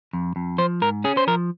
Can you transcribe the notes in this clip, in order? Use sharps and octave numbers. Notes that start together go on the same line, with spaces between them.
F2
F2
F3 C5
G#2 A#4
C#4 G#4
C5
F3 A#4